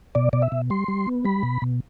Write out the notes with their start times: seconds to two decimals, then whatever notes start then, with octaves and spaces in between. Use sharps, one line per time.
0.15 B2 D5
0.33 B2 D5
0.42 E5
0.52 B2
0.70 G3 C6
0.88 G3
1.07 B3
1.25 G3 B5
1.43 B2
1.62 B2